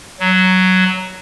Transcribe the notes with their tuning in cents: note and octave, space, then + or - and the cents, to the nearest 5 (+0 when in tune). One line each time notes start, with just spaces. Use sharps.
F#3 +5